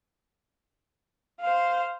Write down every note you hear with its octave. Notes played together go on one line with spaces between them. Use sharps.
C5 F5